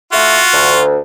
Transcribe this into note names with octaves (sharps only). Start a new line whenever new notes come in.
A3 F4 F#4
D2